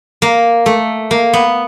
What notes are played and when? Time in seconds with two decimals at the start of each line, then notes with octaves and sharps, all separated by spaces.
0.22 A#3
0.66 A3
1.11 A#3
1.33 B3